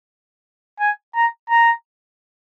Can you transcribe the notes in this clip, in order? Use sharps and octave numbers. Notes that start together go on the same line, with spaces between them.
G#5
A#5
A#5